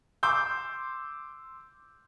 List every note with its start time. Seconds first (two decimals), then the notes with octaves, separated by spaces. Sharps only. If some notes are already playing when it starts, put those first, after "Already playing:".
0.23 C6 D6 E6 G6